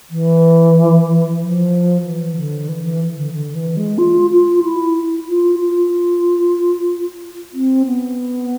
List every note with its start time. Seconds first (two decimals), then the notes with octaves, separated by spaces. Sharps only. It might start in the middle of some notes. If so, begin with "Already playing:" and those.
0.10 E3
1.40 F3
2.04 E3
2.37 D3
2.68 E3
2.85 E3
3.17 D3
3.33 D3
3.55 E3
3.77 G#3
3.98 F4
4.31 F4
4.63 E4
5.28 F4
5.60 F4
7.54 C4
7.86 B3